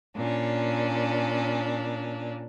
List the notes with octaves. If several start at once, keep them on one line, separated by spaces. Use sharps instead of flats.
A#2 C#4 D4